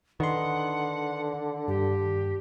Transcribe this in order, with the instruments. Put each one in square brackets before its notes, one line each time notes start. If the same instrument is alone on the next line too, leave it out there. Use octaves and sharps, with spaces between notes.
[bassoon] D3 [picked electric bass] D#3 [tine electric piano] B4 C6 [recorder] F#5
[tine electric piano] G2 [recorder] G4